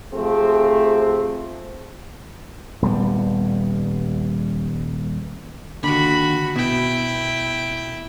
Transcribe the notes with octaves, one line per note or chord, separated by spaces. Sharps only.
C3 F3 A3 C4 G#4
D#1 G3 B3
D#2 D3 F#4 B5
B2 E4 G5